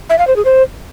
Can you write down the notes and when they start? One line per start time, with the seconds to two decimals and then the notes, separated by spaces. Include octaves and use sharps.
0.09 E5
0.18 F5
0.27 C5
0.36 G#4
0.45 C5